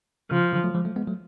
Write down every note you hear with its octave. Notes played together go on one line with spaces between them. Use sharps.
C#3 F3
D3 F#3
F#3 A3
F3 G#3
F#3 A3
G#3 B3
F#3 A3